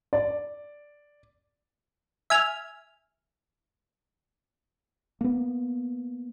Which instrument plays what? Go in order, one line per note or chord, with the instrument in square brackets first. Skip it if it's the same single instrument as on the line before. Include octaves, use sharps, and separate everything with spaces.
[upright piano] D5
[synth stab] E5 G#5 F6
[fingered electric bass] A#3 B3